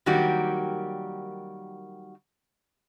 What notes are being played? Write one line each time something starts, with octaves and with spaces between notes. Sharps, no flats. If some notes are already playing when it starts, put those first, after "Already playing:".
D#3 F#3 G3 A#3 F#4 G4